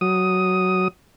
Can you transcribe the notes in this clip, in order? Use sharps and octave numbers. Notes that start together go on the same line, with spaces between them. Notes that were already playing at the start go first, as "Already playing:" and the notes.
F#3 D#6